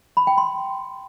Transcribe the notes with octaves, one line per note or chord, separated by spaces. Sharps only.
B5
G5
C6